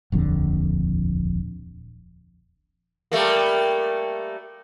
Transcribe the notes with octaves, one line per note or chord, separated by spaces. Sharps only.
D#1 A#1 F2 D3
G3 A3 A#3